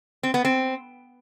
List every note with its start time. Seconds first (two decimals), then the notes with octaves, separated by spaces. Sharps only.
0.23 C4
0.34 B3
0.45 C4